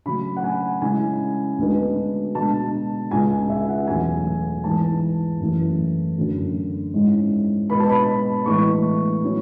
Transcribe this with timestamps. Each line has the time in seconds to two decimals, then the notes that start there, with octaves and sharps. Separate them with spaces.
0.06 C#3 F#3 A3 B5
0.37 F#5
0.44 G#5
0.82 C#3 G#3 C#4 E4 G#5
1.58 D2 D3 G#3 B3 D4
2.35 B2 G#3 D4 A5
3.11 C#2 C#3 G#3 G#5
3.50 E5
3.68 F#5
3.87 E2 B2 F#3 A3 G#5
4.64 G#2 E3 B3 A5
5.40 F#2 E3 A3 E4
6.17 F#2 D3 F#3 A3
6.94 G#2 G#3 C#4 E4
7.70 B2 G#3 B3 B5
7.80 A5
7.89 B5
8.46 A2 E3 G#3 B3 E4 C#6
9.23 F#3 C#4 E4